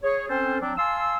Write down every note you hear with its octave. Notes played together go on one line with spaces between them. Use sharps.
G#4 C#5
C4 C#4 A4 C5
F#3 C4 D4
F5 G#5 A5 C6 E6